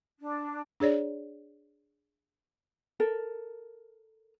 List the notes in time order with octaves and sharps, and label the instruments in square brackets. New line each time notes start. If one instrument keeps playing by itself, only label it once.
[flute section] D4
[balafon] D4 G#4 C#5 D5
[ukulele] A4 A#4